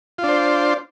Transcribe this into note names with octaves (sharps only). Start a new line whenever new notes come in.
D4 F4 C5